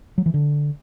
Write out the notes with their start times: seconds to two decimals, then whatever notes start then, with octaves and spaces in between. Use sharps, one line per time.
0.18 F#3
0.26 E3
0.34 D3